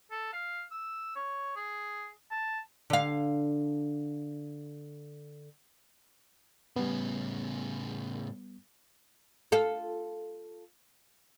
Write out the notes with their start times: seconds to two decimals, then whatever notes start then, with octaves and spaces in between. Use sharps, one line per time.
0.11 A4
0.33 F5
0.71 E6
1.16 C#5
1.56 G#4
2.31 A5
2.90 D3 F5
6.76 A2 C#3 G3 B3
9.52 F4 A4